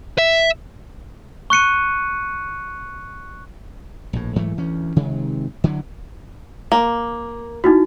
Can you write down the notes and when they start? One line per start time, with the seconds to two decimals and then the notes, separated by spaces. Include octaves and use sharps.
0.18 E5
1.50 C#6 F#6 C#7 D#7
4.13 A#1 A2
4.36 G#2 E3 F#3 A3
4.57 D2 E3 C#4
4.96 C3 D#3 F#3 G#3
5.64 D3 E3 F#3
6.72 A#3
7.64 D#4 E4 F#4